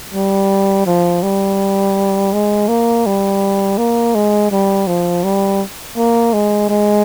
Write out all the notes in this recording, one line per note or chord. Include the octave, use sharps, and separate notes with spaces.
G3
F3
G3
G#3
A#3
G3
A#3
G#3
G3
F3
G3
A#3
G#3
G#3